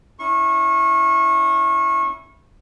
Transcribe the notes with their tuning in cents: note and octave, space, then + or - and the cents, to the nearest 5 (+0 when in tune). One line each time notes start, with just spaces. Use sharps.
C#4 +30 E4 -10 C#6 -25